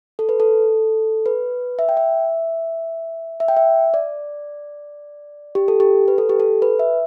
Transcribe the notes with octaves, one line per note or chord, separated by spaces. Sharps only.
A4
B4
A4
B4
E5
G5
E5
E5
G5
E5
D5
G4
A4
G4
B4
A4
G4
A4
B4
E5